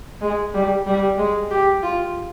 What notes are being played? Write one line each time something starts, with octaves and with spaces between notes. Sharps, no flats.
G#3
G3
G3
G#3
G4
F4